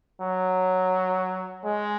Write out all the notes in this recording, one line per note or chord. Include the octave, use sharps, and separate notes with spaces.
F#3
G#3